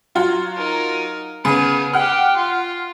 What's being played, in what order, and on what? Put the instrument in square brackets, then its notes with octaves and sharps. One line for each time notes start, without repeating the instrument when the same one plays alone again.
[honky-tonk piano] F#3 F4 F#4
[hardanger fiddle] D#4 A#4
[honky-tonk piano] C#3 [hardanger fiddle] B3 G#4
[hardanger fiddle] G4 G5 [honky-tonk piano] F#5 F6
[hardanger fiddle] F4